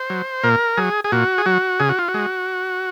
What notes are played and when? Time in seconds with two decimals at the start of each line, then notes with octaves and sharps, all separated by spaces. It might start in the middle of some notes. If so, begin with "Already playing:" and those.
Already playing: C5
0.10 F#3
0.44 A#2 A#4
0.77 F#3 G#4
1.04 G#4
1.12 A#2 F#4
1.38 G#4
1.46 F#3 F#4
1.80 C#3 G#4
1.89 F#4
1.99 F4
2.08 F#4
2.14 G#3